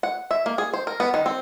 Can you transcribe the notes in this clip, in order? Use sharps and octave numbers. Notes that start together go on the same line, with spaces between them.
F#5
E5
A#3
G#4
C5
A#4
B3
D#3
C4